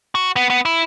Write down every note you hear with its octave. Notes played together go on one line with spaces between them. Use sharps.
F#4
B3
B3
E4